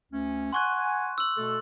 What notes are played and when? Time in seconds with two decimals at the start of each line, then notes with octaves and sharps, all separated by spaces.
0.12 D2 A3 C#4
0.53 F#5 G#5 C6 C#6 F#6
1.18 E6 F#7
1.37 B2 A3 A4